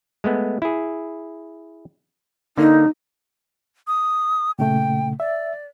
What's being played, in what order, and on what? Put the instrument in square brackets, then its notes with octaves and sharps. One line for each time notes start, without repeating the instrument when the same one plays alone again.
[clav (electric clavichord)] G#3 A3 B3
E4 G#4
[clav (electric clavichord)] D3 A#3 [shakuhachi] D#4
[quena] D#6
[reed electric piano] A#2 C#3 A3 [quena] G5
[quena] D5 [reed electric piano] E5